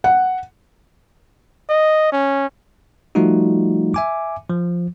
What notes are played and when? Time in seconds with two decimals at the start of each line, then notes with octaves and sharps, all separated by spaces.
0.04 F#5
1.69 D#5
2.12 C#4
3.15 F3 G3 A3 D#4 F4 F#4
3.94 E5 G#5 D6
4.50 F3